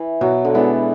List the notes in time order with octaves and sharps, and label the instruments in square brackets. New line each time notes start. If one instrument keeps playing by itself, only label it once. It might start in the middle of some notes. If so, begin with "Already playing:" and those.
Already playing: [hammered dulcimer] E3
[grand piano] B2 [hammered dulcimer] F#3
[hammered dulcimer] D3
[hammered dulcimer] E3 [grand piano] G#3 B3 D4